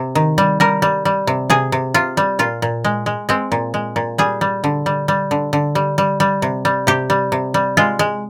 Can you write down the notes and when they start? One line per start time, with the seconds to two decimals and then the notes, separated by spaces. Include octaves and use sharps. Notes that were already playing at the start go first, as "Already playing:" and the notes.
Already playing: C3
0.15 D#3
0.38 G3
0.60 G3 A#4
0.82 G3
1.05 G3
1.27 C3
1.50 C3 G#4
1.72 C3
1.94 C3 F4
2.17 G3
2.39 A#2 F4
2.62 A#2
2.84 G#3
3.06 G#3
3.29 G#3 C4
3.52 A#2
3.74 G#3
3.96 A#2
4.18 G3 G#4
4.41 G3
4.64 D3
4.86 G3
5.08 G3
5.31 D3
5.53 D3
5.75 G3
5.98 G3
6.20 G3
6.42 C3
6.65 G3
6.87 C3 G4
7.10 G3
7.32 C3
7.54 G3
7.77 G#3 F4
7.99 G#3